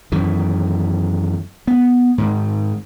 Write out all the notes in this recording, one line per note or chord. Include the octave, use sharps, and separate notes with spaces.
F#2 D#3 E3
B3
G#2 D#3